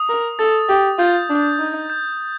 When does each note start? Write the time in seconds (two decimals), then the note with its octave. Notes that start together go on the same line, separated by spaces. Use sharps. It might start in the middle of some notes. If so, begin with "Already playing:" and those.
Already playing: D#6
0.09 A#4
0.39 A4 A6
0.69 G4
0.99 F4 G6
1.30 D4
1.59 D#4
1.90 G6